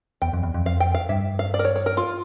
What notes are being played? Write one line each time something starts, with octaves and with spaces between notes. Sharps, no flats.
E2 G5
F2
E2
F2
F2 F5
G5
F5
G2 E5
F5
D5
A#4
C#5
C#5
A#4
F4